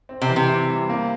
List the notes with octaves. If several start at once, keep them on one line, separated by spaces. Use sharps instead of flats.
C4
C3
E3
C3
E4
G3
A#3